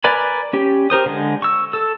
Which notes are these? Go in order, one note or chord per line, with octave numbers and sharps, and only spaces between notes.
A#4 B4 D5 G#5 B5
C#4 G4
G4 A#4 C5 D#6
D3 G#3
C#6 E6
A4 E6